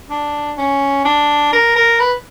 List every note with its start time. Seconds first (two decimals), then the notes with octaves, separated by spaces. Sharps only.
0.10 D4
0.57 C#4
1.05 D4
1.52 A#4
1.76 A#4
2.00 B4